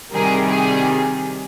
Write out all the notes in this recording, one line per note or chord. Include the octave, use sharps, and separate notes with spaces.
C3 D#3 G3 G#4 A#4
G#4